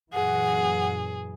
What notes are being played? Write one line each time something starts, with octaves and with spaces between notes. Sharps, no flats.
F#2 A#2 E3 G#4 F#5